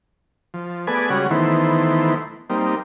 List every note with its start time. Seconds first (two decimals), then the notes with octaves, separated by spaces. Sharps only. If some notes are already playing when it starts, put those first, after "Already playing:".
0.54 F3
0.87 A3 B3 G#4 B4 D5 G#5
1.10 C#3 G3 G#3 C#4 F#4 F#5
1.31 D#3 E3 A3 B3 E4 C5
2.50 G3 A#3 C4 D#4